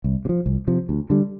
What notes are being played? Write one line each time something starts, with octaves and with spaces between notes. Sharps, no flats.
C2
C3
F3
C2
C3 F3
D2
D3 G3